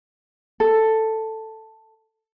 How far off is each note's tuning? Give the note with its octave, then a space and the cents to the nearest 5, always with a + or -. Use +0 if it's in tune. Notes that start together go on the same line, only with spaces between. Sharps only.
A4 +5